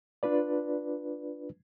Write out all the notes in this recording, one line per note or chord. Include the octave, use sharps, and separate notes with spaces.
D4 F4 B4 D5